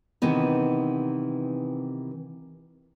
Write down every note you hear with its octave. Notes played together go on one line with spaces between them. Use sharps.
C3 D#3 E3 B3 D#4